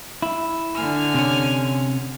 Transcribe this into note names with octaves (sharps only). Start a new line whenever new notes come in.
E4
D3 G#5 F6
C3 C#4